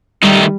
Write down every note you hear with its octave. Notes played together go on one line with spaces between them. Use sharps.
D#3 G3 A3 D#4